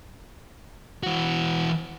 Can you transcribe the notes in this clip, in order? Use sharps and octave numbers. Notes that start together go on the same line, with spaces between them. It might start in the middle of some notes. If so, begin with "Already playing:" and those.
E3 F#4